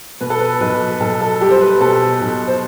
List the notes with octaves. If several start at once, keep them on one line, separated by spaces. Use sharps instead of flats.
B2 B4
A4
B4
B1 B4
B1 A4
A4
G3 G4
C5
B4
B2 A4
B1
C5